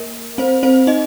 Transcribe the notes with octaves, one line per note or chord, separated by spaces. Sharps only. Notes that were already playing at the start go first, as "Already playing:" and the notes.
Already playing: A#3 A#4
C4 C5
C4 C5
D#4 D#5